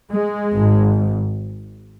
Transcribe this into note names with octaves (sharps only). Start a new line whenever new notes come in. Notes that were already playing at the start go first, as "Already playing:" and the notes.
G#3
G#1 G#2